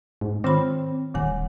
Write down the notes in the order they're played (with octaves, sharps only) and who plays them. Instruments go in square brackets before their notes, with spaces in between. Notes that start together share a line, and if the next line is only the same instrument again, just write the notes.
[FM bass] G#2
[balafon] D#3 F4 B5 [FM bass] C4
[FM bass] D1 [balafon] D#3 G3 G#5